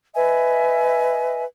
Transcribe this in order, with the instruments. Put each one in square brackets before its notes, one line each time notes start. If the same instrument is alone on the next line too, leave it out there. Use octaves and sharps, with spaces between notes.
[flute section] B4 D#5 E5 G#5